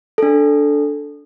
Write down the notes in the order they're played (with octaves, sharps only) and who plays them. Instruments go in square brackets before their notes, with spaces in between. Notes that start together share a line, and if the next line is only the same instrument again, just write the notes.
[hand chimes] D4 A4